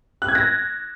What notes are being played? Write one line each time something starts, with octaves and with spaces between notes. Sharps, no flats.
F#6
G#6
A#6